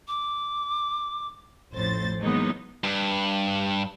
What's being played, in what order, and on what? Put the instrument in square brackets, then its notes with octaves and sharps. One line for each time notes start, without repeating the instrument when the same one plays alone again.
[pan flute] D6
[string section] A1 F2 A2 C5 A6
E3 F#3 G#3 A#3 B3 D#4
[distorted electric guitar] G2